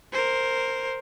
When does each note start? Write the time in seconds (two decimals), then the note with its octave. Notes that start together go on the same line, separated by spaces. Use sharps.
0.13 A#4 C5